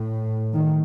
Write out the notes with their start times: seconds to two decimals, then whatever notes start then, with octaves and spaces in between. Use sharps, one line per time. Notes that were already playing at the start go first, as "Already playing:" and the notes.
Already playing: A2
0.54 D#3